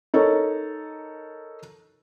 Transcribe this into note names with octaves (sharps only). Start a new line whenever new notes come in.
D#4 A4 A#4 C#5